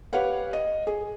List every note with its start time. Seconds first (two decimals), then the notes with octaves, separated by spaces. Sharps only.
0.13 G4 B4 C#5 F5 F#5
0.53 D#5
0.87 G#4